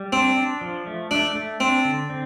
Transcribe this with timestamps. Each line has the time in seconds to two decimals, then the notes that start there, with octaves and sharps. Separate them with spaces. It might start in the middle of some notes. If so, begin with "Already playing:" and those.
Already playing: G3
0.13 C4 D4
0.37 D4
0.61 F3
0.87 A3
1.11 A3 D4
1.35 A3
1.60 C4 D4
1.85 D3
2.10 C4